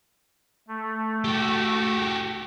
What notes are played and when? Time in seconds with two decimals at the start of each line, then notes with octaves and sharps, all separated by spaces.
0.68 A3
1.24 F#4 G4